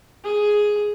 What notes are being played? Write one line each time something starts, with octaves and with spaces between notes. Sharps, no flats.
G#4